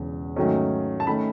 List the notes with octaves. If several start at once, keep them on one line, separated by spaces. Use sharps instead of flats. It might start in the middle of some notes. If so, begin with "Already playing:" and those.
Already playing: E1 E2 C#3
G#2 D#3 F#3 A3 C#4
A5
D#3 A3 C#4 B5